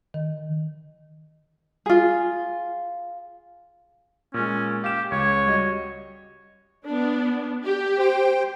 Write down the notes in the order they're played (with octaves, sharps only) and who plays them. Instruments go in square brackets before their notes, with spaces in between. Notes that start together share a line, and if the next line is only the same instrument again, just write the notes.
[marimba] D#3
[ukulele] F4 G#4
[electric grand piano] A#2 G#3 [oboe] C#4
[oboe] G4 [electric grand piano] F5 E7
[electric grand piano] C#2 [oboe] C#5
[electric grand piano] G3 F#4 D#5
[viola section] B3 D4
G4
[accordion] C5 G5